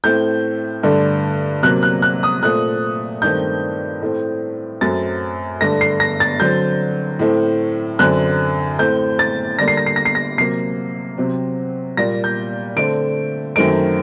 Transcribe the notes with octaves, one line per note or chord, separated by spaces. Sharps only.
A2 A3 C4 G6
G2 D3 A3
C3 F#3 A#3 F#6
F#6
F#6
D#6
A#2 A3 C4 F#6
G2 D#3 A3 C4 G6
A2 A3 C4
F#2 F#3 A3 C4 A6
G2 D3 A3 A#6
C7
A#6
A6
D3 F#3 C4 G6
A2 A3 C4
F#2 D3 F#3 C4 F#6
A2 A3 C4 G6
A6
D3 G3 A#3 A#6
C7
A#6
C7
A#6
C7
A#6
C3 F#3 A#3 C7
C3 F#3 C4
A#2 G3 A#3 A#6
G6
D3 A3 C4 D7
F#2 D#3 F#3 A3 C4 D7